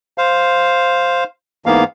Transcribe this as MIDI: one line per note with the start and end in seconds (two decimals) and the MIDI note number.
0.18 1.24 72
0.18 1.24 77
1.66 1.84 44
1.66 1.84 52
1.66 1.84 58
1.66 1.84 59
1.66 1.84 77